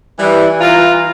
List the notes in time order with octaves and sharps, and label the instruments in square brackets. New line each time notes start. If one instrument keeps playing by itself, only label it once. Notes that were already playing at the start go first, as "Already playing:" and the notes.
[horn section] E3 G3
E3 F4 A#5